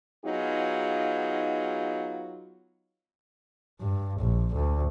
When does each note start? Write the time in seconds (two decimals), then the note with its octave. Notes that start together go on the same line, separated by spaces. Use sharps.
0.25 F#3 B3 D#4 F4 G#4
3.80 G2
4.20 A#1
4.54 D2